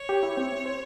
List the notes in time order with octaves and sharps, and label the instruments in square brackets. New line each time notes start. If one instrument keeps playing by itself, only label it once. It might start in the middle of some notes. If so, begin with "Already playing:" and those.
Already playing: [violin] C#5
[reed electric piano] G4
E4
C4
C5